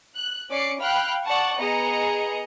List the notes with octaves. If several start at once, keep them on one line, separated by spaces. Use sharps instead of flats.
F#6
C#4 D5 D6 C7 C#7
F5 G5 B5 F6 F#6
D5 F#5 A5 C#6
B3 G#4 D#5 A#5 C#7